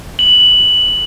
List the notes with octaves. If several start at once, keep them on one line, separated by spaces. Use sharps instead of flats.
F#7